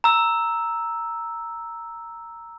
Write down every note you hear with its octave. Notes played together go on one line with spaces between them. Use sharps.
A#5 E6